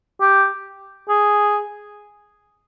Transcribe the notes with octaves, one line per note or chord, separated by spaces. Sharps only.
G4
G#4